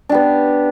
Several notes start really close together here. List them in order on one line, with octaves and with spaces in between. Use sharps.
D4 G4 B3